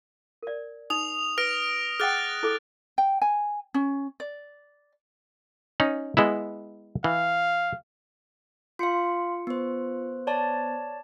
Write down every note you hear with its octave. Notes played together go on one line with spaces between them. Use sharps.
A#4 D5
D#4 D#6 F7
B4 F6 A#6 D7
G#4 F#5 G5 F6 F#6 A6
E4 A4 D6
G5
G#5
C#4
D5
C#4 D#4
G#3 B3 E4
E3 F5
F4 F5 C6 C#7
B3 C5
C#5 D5 A5